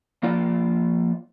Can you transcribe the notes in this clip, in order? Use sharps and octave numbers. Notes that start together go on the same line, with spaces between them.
F3 A#3 F4 D5